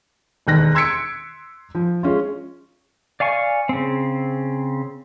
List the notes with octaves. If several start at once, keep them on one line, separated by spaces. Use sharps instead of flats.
E1 D#2 F#6 A#6
C6 E6 G#6 B6 C#7 D7
F3
G#3 C#4 F4
D5 F5 G#5 C#6
C#3 C4